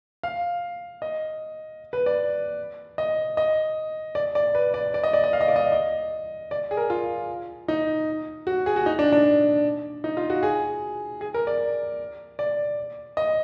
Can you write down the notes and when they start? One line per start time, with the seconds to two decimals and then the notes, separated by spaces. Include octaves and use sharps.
0.23 F5
1.02 D#5
1.93 B4
2.06 D5
2.98 D#5
3.37 D#5
4.15 D5
4.35 D5
4.55 B4
4.74 D5
4.94 D5
5.03 D#5
5.13 D5
5.24 D#5
5.33 F5
5.41 D#5
5.48 D5
5.56 D#5
5.72 D#5
6.51 D5
6.71 G#4
6.77 A#4
6.90 F4
7.68 D#4
8.47 F#4
8.66 G#4
8.76 F#4
8.86 D#4
8.99 D4
9.12 D4
10.04 D#4
10.17 F4
10.30 F#4
10.43 G#4
11.21 G#4
11.34 A#4
11.47 D5
12.39 D5
13.17 D#5